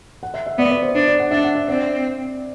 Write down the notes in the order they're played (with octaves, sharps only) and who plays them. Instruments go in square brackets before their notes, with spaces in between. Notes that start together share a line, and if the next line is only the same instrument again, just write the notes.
[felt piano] F#5
E5
E5
[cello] B3 [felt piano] D5
[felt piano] D5
C5
[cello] D4 [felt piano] C5
[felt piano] D5
F#5
[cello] D4 [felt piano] E5
[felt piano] F#5
E5
[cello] C4 [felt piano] D5